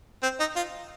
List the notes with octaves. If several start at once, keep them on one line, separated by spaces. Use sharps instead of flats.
C4
D#4
F4